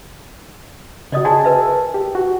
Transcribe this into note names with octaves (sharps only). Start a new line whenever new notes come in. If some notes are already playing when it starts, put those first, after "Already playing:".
C#3 F#4 D5 D#5 D#6
F#4 G#4 C#5 G#5 A5
A#4 B4 E5
G4
F#4